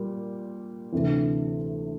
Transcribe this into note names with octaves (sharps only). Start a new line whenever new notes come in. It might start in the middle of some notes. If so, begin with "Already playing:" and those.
Already playing: A#2 G3
D2 C3 E3